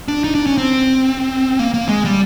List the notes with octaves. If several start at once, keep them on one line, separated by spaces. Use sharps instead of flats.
D4
D#4
D4
C#4
C4
A#3
A#3
G#3
G3